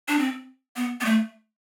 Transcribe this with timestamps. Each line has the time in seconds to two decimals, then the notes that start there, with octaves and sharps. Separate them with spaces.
0.08 D4
0.19 C4
0.76 B3
1.01 B3
1.05 A3